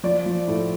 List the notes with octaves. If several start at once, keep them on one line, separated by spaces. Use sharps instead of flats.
F3 D5
F3
A2